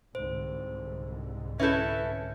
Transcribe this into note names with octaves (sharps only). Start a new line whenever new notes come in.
C2 G#2 D3 C5
C#4 E4 A4 B4 E5 G6